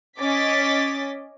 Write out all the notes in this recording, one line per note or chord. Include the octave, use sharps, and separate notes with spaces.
C#4 D#5 D6 A6 B6